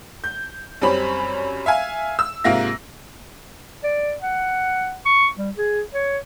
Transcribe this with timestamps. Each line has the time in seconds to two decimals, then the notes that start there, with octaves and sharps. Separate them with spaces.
0.24 G6
0.82 F#2 G3 C4 C#4 B5
1.66 E5 F5 G#5
2.19 E6
2.44 G#2 C3 A#3 F4 E5 A#6
3.84 D5
4.22 F#5
5.06 C#6
5.38 G3
5.57 G#4
5.94 C#5